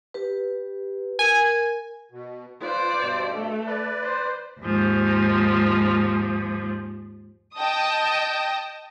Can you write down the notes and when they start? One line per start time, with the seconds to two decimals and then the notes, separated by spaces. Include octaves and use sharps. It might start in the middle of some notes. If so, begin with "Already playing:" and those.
0.14 G4 B4
1.19 A#4 G#5
2.11 B2
2.62 F4 B4 C5 D5
2.99 G2 B2
3.32 A3
3.67 B4 D5
4.04 C5
4.60 D#2 G#2 F3
7.56 D#5 G5 A5 D#6